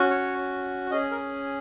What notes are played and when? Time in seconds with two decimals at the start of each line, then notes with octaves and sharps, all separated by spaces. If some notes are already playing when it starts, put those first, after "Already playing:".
Already playing: C#4 F#4
0.10 C#5
0.91 C#4 G#4 D#5
1.11 A#4